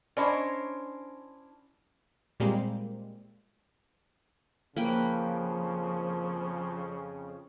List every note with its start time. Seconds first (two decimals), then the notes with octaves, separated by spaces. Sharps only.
0.17 C#4 D4 E4 C5 C#5 D#5
2.40 A#2 G3 G#3 A#3 C4
4.76 F2 C#3 F3 A#3 B4 G5